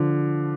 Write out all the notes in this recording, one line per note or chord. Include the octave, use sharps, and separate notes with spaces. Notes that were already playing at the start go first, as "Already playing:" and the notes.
Already playing: D3 F3